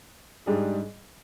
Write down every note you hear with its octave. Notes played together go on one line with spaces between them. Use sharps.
G#2 G3 D4 G#4